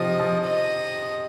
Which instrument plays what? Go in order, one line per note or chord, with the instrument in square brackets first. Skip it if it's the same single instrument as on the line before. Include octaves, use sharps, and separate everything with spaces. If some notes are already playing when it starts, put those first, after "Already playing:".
Already playing: [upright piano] C3 F3 [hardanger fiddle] D#5
[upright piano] F3
[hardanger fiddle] D#5